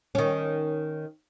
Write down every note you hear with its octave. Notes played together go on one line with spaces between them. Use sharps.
D#3 C#4